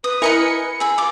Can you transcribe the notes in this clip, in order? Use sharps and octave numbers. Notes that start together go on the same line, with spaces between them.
B4 D#6
E4 A#4 D#5 G#5 B5 C#7
G#4 B5 E6
F4 D6